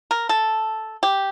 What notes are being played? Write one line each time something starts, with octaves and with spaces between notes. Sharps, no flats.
A#4
A4
G4